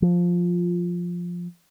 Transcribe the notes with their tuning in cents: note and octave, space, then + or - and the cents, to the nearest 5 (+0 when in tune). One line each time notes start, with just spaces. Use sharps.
F3 +5